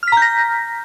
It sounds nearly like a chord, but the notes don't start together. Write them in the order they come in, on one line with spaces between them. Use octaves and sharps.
F6 B6 A#5 G6 A#6